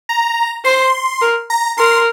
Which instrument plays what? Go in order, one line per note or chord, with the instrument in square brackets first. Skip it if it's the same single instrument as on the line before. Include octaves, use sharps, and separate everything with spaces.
[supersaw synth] A#5
[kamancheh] C5 [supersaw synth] C6
[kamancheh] A#4
[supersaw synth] A#5
[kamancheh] A#4 [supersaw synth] C6